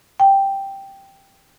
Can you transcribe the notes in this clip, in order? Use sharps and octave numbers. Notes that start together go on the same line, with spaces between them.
G5